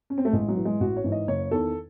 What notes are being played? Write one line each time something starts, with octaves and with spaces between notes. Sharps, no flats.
C#4
C4
A3
A1 G#3
F#3
A2 E3
G#3
A1 F#4
C#5
G#2 E3
D#5
F#1 C#5
E2 D#3 A4